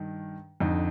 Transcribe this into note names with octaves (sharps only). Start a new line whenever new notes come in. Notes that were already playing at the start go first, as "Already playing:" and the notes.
Already playing: G2 D#3
F2 D3 D#4